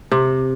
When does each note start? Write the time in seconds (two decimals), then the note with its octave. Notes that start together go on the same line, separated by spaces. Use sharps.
0.11 C3